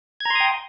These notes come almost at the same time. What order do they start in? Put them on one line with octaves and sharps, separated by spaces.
G#6 A#5 C6 D#6 G5